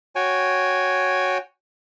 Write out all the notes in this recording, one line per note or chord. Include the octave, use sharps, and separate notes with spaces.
F#4 C#5 G5 G#5